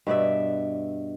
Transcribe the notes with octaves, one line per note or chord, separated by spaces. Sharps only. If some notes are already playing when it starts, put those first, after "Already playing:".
G2 B2 D5 E5